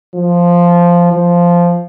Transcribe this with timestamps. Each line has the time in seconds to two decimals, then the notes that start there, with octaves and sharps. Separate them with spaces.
0.15 F3
1.13 F3